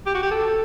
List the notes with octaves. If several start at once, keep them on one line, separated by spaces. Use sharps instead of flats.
G4
F#4
G4
A4